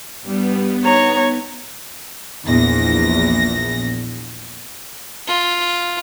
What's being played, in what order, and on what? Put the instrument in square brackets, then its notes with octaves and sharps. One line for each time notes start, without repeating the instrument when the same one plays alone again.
[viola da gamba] G2 G3 [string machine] B3
[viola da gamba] D#4 [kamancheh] C#5 [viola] A#5
[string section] A#1 E2 A#6
[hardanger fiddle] F4